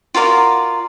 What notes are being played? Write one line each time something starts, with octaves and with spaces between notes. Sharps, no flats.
F4 F#4 A#4 D5